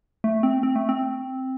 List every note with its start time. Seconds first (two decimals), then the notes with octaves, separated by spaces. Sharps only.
0.24 A3
0.43 C4
0.63 C4
0.76 A3
0.89 C4